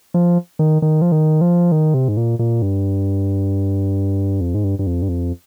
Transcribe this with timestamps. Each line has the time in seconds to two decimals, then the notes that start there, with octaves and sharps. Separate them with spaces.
0.14 F3
0.59 D#3
0.82 D#3
1.02 F3
1.12 D#3
1.41 F3
1.72 D#3
1.94 C3
2.08 G#2
2.17 A#2
2.39 A#2
2.62 G2
4.41 F2
4.55 G#2
4.64 G2
4.79 G2
4.87 F2
5.02 G2
5.09 F2